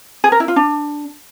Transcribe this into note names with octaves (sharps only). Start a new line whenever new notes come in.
G#4
A#4
E4
F4
D4